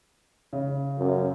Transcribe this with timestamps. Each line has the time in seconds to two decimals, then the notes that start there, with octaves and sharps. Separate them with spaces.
0.53 C#3
0.99 F#2